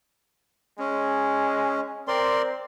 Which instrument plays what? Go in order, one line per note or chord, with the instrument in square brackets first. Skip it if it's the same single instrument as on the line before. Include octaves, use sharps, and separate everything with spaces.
[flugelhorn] G#3 [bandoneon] C#4
[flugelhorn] C4 [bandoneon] A#4 D5 C6